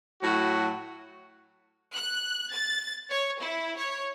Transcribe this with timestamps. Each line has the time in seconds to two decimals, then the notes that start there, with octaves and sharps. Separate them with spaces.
0.22 A2 F#3 F#4
1.95 F#6
2.52 A6
3.10 C#5
3.39 E4
3.77 C#5